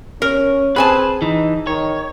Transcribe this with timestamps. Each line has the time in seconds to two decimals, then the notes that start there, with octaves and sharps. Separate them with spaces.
0.22 C#4 A#4
0.76 C4 G#4 B4 G#5 A5
1.22 E3 D#4
1.67 D#3 C#5